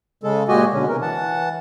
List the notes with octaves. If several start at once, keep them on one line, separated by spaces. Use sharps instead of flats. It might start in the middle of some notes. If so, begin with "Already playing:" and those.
C#3 G#3 A4
A#2 G#3 F#4 G4 D#5 G#5
B2 D3 C#4
C3 E3 A#4
E3 F#5 A5